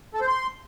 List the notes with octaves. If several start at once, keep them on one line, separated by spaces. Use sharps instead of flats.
A4
C5
C6